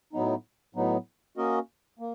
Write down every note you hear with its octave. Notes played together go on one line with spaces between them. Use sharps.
A2 F#3 B3 D#4
A2 F#3 B3 D#4
A#3 C#4 F#4 A#4 D#5
A#3